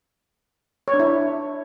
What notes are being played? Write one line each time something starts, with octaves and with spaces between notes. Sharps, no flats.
C#5
D4
E4